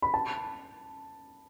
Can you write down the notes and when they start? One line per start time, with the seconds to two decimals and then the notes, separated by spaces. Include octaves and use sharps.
0.02 B5
0.14 A5